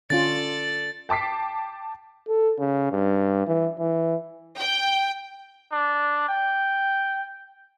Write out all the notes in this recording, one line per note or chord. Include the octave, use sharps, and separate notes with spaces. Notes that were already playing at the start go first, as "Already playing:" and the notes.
D3 C#4 F4 A4 D5 A6
G5 A5 D6 B6 C7
A4
C#3
G2
E3
E3
G5
D4
G5